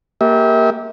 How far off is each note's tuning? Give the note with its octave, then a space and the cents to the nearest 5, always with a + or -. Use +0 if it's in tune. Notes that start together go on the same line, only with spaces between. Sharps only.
A#3 +0 G4 +0 E5 -35